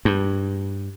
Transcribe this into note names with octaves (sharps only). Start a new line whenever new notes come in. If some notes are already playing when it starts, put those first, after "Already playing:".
G2